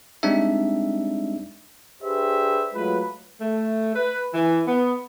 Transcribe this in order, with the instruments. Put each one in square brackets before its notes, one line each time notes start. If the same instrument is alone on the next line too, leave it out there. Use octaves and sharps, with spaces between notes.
[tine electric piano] G3 G#3 C4 D4 D#4 E5
[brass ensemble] D4 G4 G#4 B4 C5 E5
F#3 G#3 A3 F4 B4
[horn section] A3
B4
E3
B3